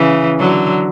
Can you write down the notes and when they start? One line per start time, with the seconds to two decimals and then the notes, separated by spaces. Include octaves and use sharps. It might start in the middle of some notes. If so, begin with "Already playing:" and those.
Already playing: C#3 E3
0.39 D3 F#3